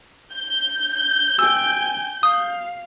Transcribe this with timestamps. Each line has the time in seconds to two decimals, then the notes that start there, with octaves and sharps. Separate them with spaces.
0.34 G6
1.39 G5 G#5 E6
2.23 F5 D#6